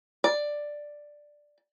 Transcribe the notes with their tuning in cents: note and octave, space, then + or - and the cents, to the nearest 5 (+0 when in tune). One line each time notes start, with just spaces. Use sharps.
D5 +5